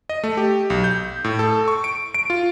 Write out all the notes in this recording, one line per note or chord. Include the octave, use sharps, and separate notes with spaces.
D#5
A3
G4
B1
G6
A2
A4
C#6
D7
D7
F4